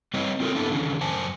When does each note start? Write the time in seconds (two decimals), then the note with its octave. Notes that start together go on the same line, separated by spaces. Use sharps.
0.14 G3 C4 B4 C#5 D#5
0.40 C4 F4 A4 A#4
0.55 B3 D4 E4 A4
0.71 E2 D3 D#3 C#4
1.01 F#2 C5 G#5 A5